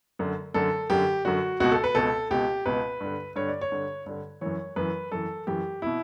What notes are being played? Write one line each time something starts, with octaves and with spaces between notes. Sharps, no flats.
F#2 D3
F#2 D3 A4
F#2 D3 G4
F#2 D3 F#4
C#2 B2 F#4
A4
B4
C#2 B2 A4
C#2 B2 G4
C#2 B2 B4
G2 D3
G2 D3 C#5
D5
C#5
G2 D3
G2 D3
F#2 E3 C#5
F#2 E3 B4
F#2 E3 A4
F#2 E3 G4
B2 E4